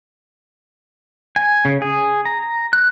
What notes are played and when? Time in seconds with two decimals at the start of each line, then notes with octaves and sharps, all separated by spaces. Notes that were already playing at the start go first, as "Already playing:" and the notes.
1.36 G#5
1.65 C#3
1.82 G#4
2.25 A#5
2.73 F#6